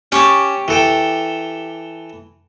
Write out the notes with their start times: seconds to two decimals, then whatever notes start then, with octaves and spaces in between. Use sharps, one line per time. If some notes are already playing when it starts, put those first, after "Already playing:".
0.12 C#4 G4 A5 C#6 D6
0.68 E3 A4 G5